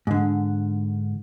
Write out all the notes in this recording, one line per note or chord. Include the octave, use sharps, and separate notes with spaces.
G#2 D3